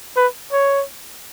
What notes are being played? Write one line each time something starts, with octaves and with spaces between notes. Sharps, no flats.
B4
C#5